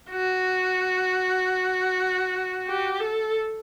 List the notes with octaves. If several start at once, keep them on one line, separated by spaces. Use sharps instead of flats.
F#4
G4
A4